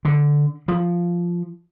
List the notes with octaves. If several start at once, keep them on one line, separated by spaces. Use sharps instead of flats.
D3
F3